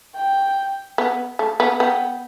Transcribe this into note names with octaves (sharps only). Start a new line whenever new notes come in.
G5
B3
A3
B3
B3 G5